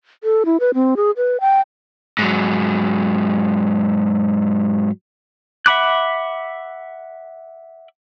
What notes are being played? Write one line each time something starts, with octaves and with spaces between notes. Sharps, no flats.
A4
E4
B4
C4
G#4
B4
G5
G#2 F#3
E5 F#5 B5 D6 F#6